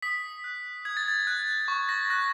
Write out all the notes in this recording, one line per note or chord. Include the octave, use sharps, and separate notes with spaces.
D#6 B6
F#6
D#6 G#6
A6
G#6
F#6
C#6
A#6
F#6 A#6